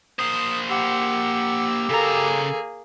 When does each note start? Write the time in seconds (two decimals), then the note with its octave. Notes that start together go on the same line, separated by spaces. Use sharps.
0.19 A#3 C5 D#6
0.70 G4 F#5 E6
1.90 C#3 A#3 G#4 A4 A#5